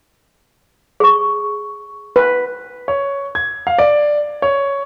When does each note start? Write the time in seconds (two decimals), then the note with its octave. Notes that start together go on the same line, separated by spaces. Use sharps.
1.00 G#4 C#6
2.16 B4
2.88 C#5
3.35 G#6
3.67 F5
3.78 D5
4.42 C#5